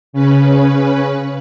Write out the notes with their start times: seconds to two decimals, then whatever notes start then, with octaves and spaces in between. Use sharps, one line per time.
0.13 C#3 C#4 B4